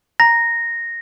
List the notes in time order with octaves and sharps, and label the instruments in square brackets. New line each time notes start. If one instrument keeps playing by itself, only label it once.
[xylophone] A#5 [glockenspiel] A#6